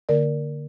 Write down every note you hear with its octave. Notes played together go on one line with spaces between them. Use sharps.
D3 A#3 A#4 D5